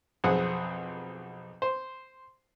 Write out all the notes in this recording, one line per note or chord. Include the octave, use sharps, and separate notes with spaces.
B1 F2 C4 G#4 F#5 D#6
C5